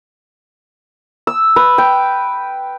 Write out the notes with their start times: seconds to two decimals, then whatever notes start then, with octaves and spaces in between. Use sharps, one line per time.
1.27 E6
1.56 B4
1.78 G5